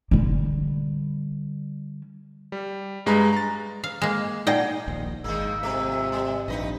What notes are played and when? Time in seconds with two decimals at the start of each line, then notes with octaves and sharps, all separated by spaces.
0.11 D3 G3
2.52 G3
3.06 G2 G#3 B4 A#5
3.33 A#5 A6
3.84 F5
4.02 G#3 A#3
4.47 A#2 D#4 D5 D#5 F#5 G5
4.88 D1 A#1 D#2
5.24 G#1 D#3 G#3 A#3 E6
5.63 F2 C3 A3 E5
6.12 G3
6.48 A#1 G2 D#4 B4 D#5